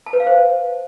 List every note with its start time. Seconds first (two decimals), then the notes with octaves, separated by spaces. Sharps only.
0.06 A5
0.13 B4
0.20 F5
0.26 C5